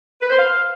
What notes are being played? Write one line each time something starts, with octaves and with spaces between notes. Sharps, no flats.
B4
C5
F5